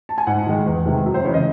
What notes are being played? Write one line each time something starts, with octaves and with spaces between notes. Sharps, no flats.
A5
G#5
G#2 F#5
D#3 G#3
E2
C3 D#3 G#3
F#2
C5
C#3 E3 G#3 C#5
D#5